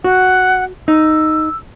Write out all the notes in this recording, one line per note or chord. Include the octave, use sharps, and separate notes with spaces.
F#4 F#5
D#4 E6